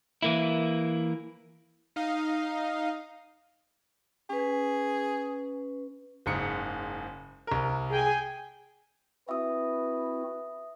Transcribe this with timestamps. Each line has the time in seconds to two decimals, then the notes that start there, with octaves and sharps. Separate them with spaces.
0.22 E3 A#3 E4
1.96 D#4 D#5 F5
4.30 C#4 G#4 B4
6.26 F#1 G#2 C#7
7.47 C2 A#4
7.90 G#4 G5 G#5
9.29 C4 E4 F#4 B4 E5 D#6